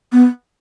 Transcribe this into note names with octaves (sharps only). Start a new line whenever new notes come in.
B3